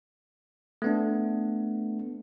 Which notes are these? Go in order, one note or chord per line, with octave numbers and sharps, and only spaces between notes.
A3 B3 D4